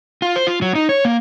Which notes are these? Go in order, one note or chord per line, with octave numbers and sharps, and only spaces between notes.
F4
C5
F4
F#3
D#4
C#5
A#3